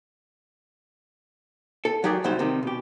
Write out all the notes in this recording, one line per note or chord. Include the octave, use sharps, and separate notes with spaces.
A4
F#3 D#4 G4 G#4 A#4 D5
C2 F#3 G3 D#4 C5
C3 D#3 G3
B2 G4